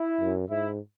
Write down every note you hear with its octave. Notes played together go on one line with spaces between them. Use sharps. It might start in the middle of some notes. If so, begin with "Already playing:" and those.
Already playing: E4
F#2
G#2 E4